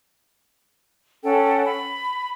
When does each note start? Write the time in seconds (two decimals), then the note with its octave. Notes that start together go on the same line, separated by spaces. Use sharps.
1.24 C#4 A4 F#5 G5
1.65 B5